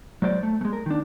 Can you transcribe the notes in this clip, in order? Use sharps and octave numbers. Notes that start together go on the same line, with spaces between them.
F#3 G#3 C5 D5
A3
G#3 A3
A#4
D#3 D4